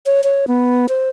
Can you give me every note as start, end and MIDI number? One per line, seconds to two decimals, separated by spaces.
0.06 0.21 73
0.24 0.46 73
0.48 0.86 59
0.89 1.09 72